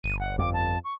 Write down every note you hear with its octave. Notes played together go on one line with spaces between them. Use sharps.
G1 D#7
F#5
F2 D6
A5
C#6